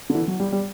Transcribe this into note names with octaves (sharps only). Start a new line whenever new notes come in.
D3
E3
F#3
G3
G3